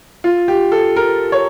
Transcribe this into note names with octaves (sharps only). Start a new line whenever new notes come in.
F4
G4
A4
A#4
C#5